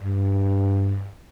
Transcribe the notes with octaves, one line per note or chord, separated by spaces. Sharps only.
G2